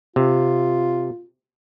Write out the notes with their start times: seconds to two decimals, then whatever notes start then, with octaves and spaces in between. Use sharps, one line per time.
0.16 C3 F4